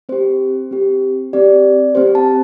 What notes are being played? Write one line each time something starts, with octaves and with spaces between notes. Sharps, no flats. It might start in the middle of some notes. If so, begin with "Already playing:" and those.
C4 G4 C5
C4 G4
C4 G4 D5
C4 G4 C5
A5